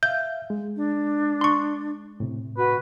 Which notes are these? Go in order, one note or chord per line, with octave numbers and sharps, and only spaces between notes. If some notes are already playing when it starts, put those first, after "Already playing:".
E5 F5 G6
G#3
D4
C6 C#6
A2 C3
F#4 B4